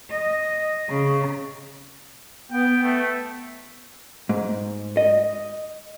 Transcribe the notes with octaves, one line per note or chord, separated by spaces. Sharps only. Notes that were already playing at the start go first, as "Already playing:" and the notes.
D#5
C#3
B3 G5
A3
G#2
D#5